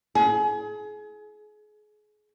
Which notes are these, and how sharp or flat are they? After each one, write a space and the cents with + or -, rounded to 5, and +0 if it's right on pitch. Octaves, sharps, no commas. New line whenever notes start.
G#4 +30